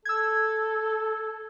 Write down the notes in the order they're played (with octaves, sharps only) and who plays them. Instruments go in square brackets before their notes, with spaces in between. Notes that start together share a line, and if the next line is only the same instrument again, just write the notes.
[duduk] A4 [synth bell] E6 G#6